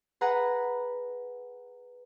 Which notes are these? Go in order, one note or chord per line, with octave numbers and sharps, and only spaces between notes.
G#4 B4 F#5 A#5